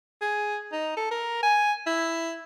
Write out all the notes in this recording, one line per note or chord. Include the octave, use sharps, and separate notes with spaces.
G#4
D#4
A4
A#4
G#5
E4